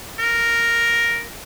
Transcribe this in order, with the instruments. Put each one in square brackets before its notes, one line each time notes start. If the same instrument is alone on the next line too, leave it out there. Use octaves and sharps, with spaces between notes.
[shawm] A#4